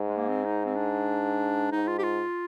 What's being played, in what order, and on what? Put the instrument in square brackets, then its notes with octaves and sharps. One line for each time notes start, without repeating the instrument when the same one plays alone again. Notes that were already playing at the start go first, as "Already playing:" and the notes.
Already playing: [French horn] G#2
[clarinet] G#3
A#3
C4
D#4
C4
D4
[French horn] G#2 [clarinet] D#4
[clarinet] F4
G4
F4